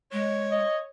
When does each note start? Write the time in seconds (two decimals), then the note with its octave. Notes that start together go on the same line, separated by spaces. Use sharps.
0.13 G#3 C#5
0.51 D#5